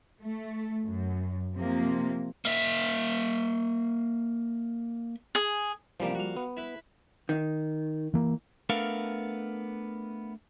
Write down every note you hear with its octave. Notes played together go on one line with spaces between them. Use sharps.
A3
F#2
C3 F3 A#3
A#3 E5
G#4
A1 C3 F3 G3 A#3 D6
F#4 F5
B3
E4 B4
D#3
E3 A#3
A3 B3 D4 A4 A#4 F5